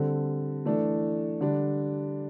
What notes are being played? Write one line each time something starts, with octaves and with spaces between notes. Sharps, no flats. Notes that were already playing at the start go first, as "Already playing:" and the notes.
Already playing: D3 G3 C4 A4
E3 A3 D4 A4
D3 G3 D4